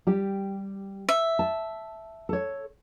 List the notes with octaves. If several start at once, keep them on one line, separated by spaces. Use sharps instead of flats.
G3 G4
E5
A5
A4 C#5